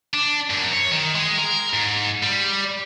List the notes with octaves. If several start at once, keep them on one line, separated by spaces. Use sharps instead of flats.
D4
F#2
C#5
D#3
G#3
A#4
G#2
G3